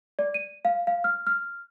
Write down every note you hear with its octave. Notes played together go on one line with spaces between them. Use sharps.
D5
D#7
F5
F5
F6
F6